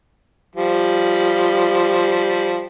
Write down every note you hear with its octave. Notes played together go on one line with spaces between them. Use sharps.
F3 G3